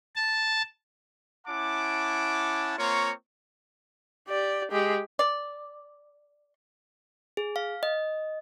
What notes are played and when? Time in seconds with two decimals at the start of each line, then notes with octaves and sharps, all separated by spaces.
0.16 A5
1.47 C#4 E4 F#5 A5 D6
2.78 A#3 C4 F4 C#5 A#5 C#6
4.29 G4 D5
4.71 G#3 G4
5.19 D5
7.37 G#4
7.56 F5
7.83 D#5